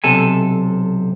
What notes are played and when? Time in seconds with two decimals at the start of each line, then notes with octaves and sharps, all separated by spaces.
0.04 B1 C3 A4 G#5